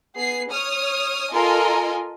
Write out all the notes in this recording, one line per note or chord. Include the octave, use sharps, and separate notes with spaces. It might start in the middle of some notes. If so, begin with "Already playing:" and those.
B3 G#4 C7
C#5 D#6 F6
F4 A4 A#4 D#5 G#5 C6